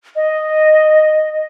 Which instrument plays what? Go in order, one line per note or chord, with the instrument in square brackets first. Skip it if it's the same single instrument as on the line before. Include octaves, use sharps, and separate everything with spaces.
[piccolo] D#5